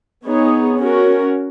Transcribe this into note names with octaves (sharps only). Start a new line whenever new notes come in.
B3 D#4 G#4 C#5
C#4 F#4 A#4